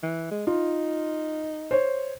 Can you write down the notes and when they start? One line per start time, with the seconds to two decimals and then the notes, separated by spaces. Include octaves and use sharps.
0.03 E3
0.31 G#3
0.47 D#4 F4
1.71 C5 C#5